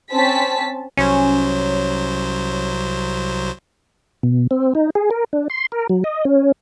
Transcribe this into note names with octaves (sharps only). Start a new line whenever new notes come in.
C4 C#4 A5 B6
C2 F#3 C#4 C5
B2
C4
D#4
G#4
A#4
D4
C6
A#4
F#3
D#5
C#4